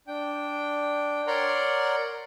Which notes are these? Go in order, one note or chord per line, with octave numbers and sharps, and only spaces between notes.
D4 G5
A#4 C#5 D5 F#5 A#5 C6